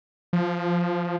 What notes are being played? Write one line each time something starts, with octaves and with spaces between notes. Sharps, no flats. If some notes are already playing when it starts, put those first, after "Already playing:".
F3